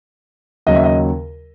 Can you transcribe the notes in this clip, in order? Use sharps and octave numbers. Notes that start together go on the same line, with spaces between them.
D#2 C#3 F#3 D#5
E5
D#5